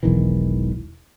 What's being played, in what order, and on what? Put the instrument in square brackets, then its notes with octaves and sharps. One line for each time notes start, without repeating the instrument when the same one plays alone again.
[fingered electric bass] E1 B1 D#3 E3